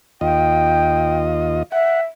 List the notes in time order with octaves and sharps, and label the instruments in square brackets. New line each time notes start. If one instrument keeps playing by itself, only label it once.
[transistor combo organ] D#2 F4 D#5 [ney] G5
[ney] E5 [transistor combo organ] F#5